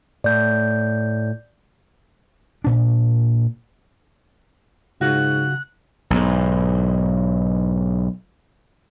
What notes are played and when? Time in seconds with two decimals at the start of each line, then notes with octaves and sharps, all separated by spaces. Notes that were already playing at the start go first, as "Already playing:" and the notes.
0.24 A2 D5 G6
2.64 A#2 D4
5.01 G#2 C#3 F#3 F4 F#4 F#6
6.10 B1 G#2